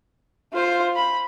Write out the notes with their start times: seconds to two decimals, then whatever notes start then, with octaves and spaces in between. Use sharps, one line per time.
0.53 F4 C5
0.96 B5